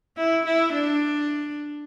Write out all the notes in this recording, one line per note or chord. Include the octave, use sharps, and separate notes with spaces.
E4
E4
D4